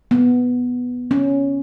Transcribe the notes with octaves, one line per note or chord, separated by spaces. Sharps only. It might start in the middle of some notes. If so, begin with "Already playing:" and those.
B3
C#4